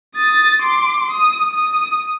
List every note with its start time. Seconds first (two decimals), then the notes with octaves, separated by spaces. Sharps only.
0.16 D#6 A6
0.62 C6 D6
1.11 D#6
1.53 D#6